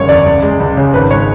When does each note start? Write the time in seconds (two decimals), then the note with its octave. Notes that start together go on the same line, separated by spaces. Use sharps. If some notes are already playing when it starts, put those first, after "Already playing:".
Already playing: F#1 D3 G#3 C#5
0.09 E2 D5
0.26 C#2
0.42 G#3
0.60 C#2
0.77 C#3
0.93 G#1 B4
1.11 G#3 C#5